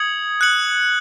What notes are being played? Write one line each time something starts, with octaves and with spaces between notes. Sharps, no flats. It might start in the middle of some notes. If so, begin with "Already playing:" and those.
Already playing: D#6 G#6 C#7 F#7
F#6 C#7 F#7